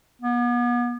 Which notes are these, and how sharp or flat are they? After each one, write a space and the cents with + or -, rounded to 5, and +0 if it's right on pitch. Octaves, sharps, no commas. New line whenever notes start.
B3 -35